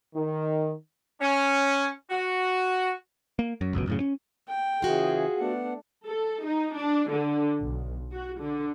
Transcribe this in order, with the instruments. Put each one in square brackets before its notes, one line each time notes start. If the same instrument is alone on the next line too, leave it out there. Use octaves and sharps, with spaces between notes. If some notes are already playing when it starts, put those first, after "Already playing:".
[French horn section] D#3
[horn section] C#4
F#4
[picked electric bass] A#3
F#2
G1 C#2 F#2 B2
F#2 A2 C#3
C#4
[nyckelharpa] G5
[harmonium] C#3 E3 [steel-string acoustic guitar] F4 F#4 C5 [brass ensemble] G#4
[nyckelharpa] A3 D4 [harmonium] B3 F#5
[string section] A4
D#4
D4
D3
B1
F#4
D3